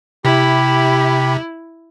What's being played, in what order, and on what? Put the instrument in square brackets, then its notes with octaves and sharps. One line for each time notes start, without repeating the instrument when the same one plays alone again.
[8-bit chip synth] C3 [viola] E4 [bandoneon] G4 B5